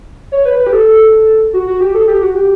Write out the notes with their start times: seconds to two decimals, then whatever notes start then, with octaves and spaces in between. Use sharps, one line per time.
0.32 C#5
0.45 B4
0.59 B4
0.67 G4
0.73 A4
1.53 F#4
1.67 F#4
1.80 G4
1.95 A4
2.08 G4
2.22 F#4
2.35 G4